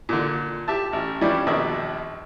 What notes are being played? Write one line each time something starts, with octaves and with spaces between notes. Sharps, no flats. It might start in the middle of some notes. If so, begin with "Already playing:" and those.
A#2 D3
G4 E5 A5
A1
E3 F3 G3 C#4 D4 E4
A#1 D#2 B2 D4 E5